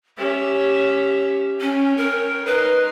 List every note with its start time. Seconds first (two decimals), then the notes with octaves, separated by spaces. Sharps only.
0.18 C#4 G4 E5
1.61 C#4 C#5 G5
1.97 A#4
2.46 D#4 B4 C6